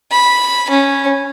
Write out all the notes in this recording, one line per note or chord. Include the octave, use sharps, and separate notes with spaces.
B5
C#4